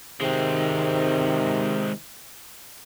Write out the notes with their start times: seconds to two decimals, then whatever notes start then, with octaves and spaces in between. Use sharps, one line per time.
0.21 C3 D#3 G#3 C4